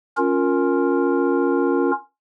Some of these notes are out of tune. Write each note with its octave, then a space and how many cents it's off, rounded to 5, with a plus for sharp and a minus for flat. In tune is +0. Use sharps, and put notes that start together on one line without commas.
C#4 +0 F4 +15 A#4 +0